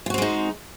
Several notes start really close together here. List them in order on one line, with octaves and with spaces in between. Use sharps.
F4 F#4 C4 G#3 D#4